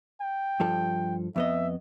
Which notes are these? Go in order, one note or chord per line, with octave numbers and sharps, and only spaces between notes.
G5
G2 F3 A4
F2 B3 D#5 E5